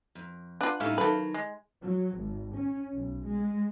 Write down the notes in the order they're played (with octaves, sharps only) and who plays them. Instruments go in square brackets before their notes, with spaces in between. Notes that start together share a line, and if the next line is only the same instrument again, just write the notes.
[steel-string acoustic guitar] F2
[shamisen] D4 F4 [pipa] B4 F#5
[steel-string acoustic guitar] A2 G3 D#4 [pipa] C#4 E4 F5
[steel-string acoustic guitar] D#3 F#3 [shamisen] A4 B4
[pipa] G#3
[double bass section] F#3
G#1
C#4
B1
G#3